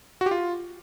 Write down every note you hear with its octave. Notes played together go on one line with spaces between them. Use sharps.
F#4
G4
F4